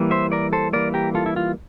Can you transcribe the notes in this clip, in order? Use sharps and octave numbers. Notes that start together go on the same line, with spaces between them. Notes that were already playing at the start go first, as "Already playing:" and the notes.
Already playing: E3 G3 A#3
C5 E5
A#4 D5
A4 C5
E3 G3 A#3 A#4 D5
G4 A#4
F4 A4
E4
F4